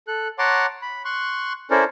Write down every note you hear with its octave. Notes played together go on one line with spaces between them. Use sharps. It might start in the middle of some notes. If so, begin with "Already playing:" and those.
A4 F#6
C#5 F#5 A5 A#5 C6 D6
B5
C6 C#6 F#6
C#4 E4 A4 A#4 C5 D5